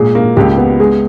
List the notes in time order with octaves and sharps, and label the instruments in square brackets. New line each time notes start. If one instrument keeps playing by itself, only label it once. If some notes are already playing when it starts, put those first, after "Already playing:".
Already playing: [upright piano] A#2 G#3 G#4
A#3
C#2 G4
B3
G#3 G#4